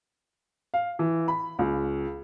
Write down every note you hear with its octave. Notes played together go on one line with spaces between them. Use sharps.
F5
E3
B5
C#2